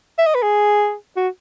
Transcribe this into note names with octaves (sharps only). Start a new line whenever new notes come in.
E5
D#5
B4
G#4
F#4